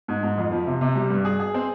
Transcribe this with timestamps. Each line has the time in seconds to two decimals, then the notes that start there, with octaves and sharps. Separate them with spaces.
0.08 G#2
0.23 G#2
0.38 F2
0.51 F3
0.67 C3
0.81 C3
0.95 G3
1.10 G2
1.25 G#4
1.40 G#4
1.54 C4